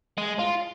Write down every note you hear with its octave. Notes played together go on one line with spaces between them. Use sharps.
G#3
F4